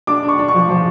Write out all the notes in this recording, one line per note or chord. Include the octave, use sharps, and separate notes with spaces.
D4 D6
D4
C#6
D4
C#6
F3
F3